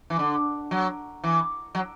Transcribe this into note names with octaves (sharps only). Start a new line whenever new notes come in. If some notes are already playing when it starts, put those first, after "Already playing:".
E3
D3
F#3
E3
F#3